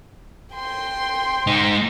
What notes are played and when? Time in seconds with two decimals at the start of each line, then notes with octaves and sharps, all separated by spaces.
0.55 G5 C6
1.47 G#3 D#4